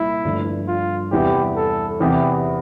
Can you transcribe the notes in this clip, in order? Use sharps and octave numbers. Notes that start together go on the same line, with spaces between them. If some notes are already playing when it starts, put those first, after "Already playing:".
Already playing: C2 A#2 E4
G1 G2 F3 A3
F4
E2 C3 E3 G3 G4
A4
E2 C3 E3 G4